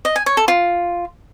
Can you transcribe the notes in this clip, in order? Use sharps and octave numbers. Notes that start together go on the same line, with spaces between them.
D#5
G#5
C#5
A4
F4